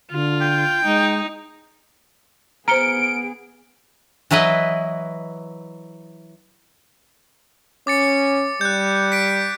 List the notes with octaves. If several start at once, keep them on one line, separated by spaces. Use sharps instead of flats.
D3 F4
G5
G#3 D#4
B3 G#4 C5 A#5 F6 C#7 D7 G7
E3 F#3 E4 B4 D#5
C#4 D6 A6 C#7
G3 F#6 G6
B6 D7